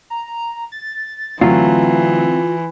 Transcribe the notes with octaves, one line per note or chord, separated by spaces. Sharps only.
A#5
A6
D3 E3 F#3 A3 C4 F4